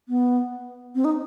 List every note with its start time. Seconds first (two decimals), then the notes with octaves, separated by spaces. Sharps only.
0.09 B3
0.95 C4
1.05 D#4